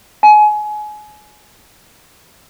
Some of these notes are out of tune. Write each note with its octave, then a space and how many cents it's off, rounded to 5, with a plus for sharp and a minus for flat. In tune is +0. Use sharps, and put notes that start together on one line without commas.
G#5 +25